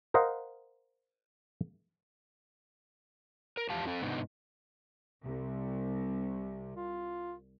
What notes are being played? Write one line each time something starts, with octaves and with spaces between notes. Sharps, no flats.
A#4 C5 D#5 F5 F#5
A#4
E2 F3 G4 F5 A5
C4 A4
G#2 C3 B3 D4 D#4
C2 C3
F4